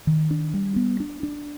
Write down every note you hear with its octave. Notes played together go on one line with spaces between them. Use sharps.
D#3
D4
G3
B3
D4
D4